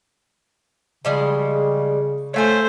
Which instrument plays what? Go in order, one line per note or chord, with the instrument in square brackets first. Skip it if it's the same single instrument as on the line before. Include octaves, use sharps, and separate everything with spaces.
[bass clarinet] C#3 [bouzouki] F3 G3 G#3
[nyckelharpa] A3 C5 [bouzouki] C#5 F5 G#5